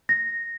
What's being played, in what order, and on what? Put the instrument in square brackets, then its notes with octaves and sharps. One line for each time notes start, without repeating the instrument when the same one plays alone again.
[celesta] A#6